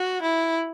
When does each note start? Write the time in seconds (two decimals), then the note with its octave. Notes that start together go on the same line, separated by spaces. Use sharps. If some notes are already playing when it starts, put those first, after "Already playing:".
Already playing: F#4
0.22 E4